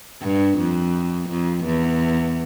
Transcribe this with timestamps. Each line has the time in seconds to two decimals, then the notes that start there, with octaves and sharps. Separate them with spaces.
0.23 G2
0.58 F2
1.30 F2
1.65 E2